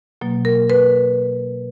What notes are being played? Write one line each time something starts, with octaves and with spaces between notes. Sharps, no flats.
B2 F#3 A#3
A#4
B4